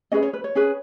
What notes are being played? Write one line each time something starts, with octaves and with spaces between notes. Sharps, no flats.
C#4 G#4 B4 D#5
C#5
B4
C#5
C#4 G#4 B4